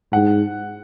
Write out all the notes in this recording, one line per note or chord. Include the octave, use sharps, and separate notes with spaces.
G#2 F#5